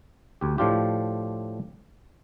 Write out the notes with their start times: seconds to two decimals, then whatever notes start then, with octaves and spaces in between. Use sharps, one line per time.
0.41 D2 G4
0.58 A2 F3 D4 F4 G4